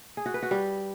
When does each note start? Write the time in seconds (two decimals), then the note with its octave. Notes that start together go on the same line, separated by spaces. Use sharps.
0.17 G#4
0.26 F#4
0.34 B4
0.43 F#4
0.51 G3